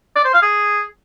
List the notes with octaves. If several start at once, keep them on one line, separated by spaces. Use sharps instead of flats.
D5
C5
F5
G#4